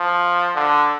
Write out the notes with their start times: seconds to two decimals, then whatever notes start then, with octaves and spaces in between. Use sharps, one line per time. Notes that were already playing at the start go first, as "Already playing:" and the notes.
Already playing: F3
0.55 D3